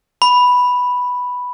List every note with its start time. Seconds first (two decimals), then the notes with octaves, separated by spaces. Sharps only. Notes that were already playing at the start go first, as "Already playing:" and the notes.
0.22 B5